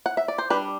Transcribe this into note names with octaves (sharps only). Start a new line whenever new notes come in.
F#5
E5
D5
C5
G3 D4 B4